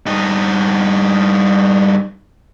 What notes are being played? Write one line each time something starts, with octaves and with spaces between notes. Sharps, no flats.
G2 D#4